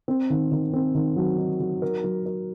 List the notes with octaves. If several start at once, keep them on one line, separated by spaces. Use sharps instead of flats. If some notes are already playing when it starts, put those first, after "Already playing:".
C4
D#3
D#3
C4
D#3
F#3
D#4
F#3
A#4
F#3
A#4